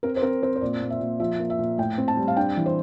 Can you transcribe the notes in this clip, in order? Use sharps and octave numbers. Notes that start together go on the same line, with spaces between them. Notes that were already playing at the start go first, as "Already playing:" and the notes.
C4 A#4
C5
C4 A#4
C4 C5
C5
A#2 D5
A#2
E5
A#2
F3 E5
A#3
E5
A#2
A2 G5
C4
A5
G3
F5
D4 G5
E3
C5